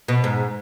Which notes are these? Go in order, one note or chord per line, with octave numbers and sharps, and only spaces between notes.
B2
G#2